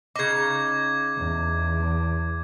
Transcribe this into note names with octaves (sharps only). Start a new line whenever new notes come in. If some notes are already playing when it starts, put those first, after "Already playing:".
C#3 D#4 D6 G#6
E2